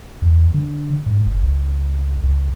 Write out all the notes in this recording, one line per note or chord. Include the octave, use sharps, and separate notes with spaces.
E2
D3
G#2
F#1
C#2
C#2